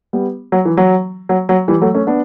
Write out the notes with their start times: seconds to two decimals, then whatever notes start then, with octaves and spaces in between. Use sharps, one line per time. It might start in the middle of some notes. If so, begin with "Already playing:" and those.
0.13 G3 B3
0.52 F#3
0.65 E3
0.77 F#3
1.29 F#3
1.49 F#3
1.68 E3 G3
1.81 F#3 A3
1.94 A3 C#4
2.07 B3 D4